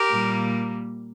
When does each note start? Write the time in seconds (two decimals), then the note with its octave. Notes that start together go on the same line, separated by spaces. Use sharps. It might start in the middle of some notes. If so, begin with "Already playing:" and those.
Already playing: G4 A#4
0.12 A#2 G3 A#3